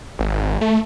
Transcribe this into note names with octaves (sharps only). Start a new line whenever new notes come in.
G#1
A3